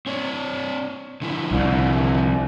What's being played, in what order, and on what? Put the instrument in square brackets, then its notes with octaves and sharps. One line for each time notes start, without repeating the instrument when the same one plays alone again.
[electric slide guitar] C4 C#5 D5
D3 F3 E4
[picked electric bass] C2